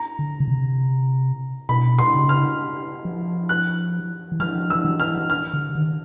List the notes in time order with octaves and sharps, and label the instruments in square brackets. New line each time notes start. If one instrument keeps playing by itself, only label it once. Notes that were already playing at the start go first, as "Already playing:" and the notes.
Already playing: [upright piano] A#5
[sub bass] D3
C#3
C3
[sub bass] B2 [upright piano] B5
[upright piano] C6
[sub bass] C#3
[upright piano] F6
[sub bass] F3
[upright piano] F#6
[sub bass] E3
[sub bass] F3 [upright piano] F6
[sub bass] F3 [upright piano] E6
[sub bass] E3
[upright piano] F6
F6
[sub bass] D3
D#3